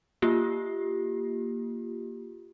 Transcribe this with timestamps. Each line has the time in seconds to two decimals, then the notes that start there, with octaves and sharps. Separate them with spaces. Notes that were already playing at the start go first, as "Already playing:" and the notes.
0.22 A#3 F4 G4